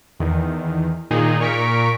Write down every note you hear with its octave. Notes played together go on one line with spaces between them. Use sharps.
E2 D#3
A#2 D#3 D#4 G#4
A#2 A#4 C#6 B6 D7